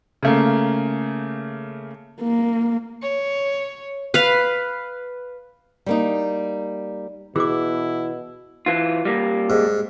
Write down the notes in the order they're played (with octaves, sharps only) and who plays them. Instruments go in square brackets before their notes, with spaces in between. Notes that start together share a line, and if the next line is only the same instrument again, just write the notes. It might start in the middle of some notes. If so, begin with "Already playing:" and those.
[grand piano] C#3 A3 A#3
[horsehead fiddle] A#3
[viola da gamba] C#5
[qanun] B4 F5
[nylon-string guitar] G3 A#3 D#4
[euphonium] B2 [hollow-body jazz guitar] E3 [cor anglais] E4 [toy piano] G#4 D6
[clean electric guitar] E3 F4
G3 A#3
[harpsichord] G#2